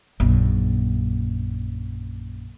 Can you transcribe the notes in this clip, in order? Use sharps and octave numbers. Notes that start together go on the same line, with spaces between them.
A#1 F#2